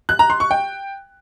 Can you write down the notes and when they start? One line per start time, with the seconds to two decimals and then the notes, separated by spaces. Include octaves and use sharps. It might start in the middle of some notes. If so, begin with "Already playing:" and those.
0.09 F#6
0.19 A#5
0.30 C6
0.40 C#6
0.51 G5